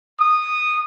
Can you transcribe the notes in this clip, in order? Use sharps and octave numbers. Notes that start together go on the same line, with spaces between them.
D#6